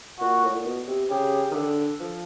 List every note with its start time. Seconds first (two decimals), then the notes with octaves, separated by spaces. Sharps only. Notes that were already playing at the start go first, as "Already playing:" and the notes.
0.21 A#2 F#4
0.44 A2
0.55 A#2
0.65 B2
0.88 C3
1.10 C#3 G4
1.51 D#3
1.55 D3
2.00 F3